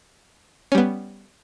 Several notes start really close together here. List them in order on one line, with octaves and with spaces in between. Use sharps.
C#4 G3 B3